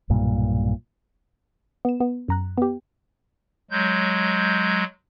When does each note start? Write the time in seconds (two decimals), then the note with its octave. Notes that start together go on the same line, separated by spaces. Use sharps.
0.10 B1 G2 A#2
1.85 B3 E7
2.00 B3
2.28 F#2 A#5 F#6
2.58 B3 G4
3.71 F#3 G#3 G6